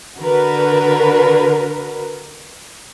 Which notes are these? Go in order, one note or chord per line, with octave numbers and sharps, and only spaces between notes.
D3 F#4 A#4 B4